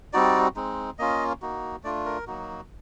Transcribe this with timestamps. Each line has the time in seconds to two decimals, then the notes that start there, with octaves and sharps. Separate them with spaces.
0.13 G3 C4 D#4 F#4 D5
0.56 G#3 C4 D#4
0.99 A#3 C#4 F4 D#5
1.42 A#3 D#4 F#4
1.83 A3 D4 F4 D5
2.05 A#4
2.27 F#3 A#3 D#4 F#4